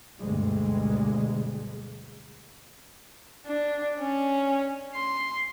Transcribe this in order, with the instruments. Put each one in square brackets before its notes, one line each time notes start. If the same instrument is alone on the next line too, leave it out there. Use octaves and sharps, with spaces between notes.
[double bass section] D2 G2 B2 G3 G#3
[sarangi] D4
C#4
C6